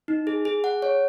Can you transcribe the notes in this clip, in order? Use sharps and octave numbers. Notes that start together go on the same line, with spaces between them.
D#4
G#4
G#4
F#5
C#5